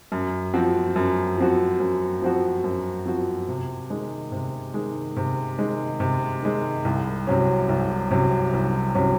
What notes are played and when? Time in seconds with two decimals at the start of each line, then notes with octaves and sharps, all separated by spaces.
0.12 F#2
0.54 F3 C4 F#4
0.96 F#2
1.37 F3 C4 F#4
1.80 F#2
2.22 F3 C4 F#4
2.64 F#2
3.06 F3 C4 F#4
3.49 C3
3.90 D#3 G#3
4.32 C3
4.74 D#3 G#3
5.16 C3
5.59 D#3 G#3
6.00 C3
6.42 D#3 G#3
6.85 C2
7.27 C3 F#3 C#4
7.69 C2
8.11 C3 F#3 C#4
8.53 C2
8.95 C3 F#3 C#4